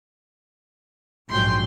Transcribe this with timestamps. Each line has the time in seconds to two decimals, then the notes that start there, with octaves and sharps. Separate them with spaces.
1.29 A#1 G#2 F#3 G5 C6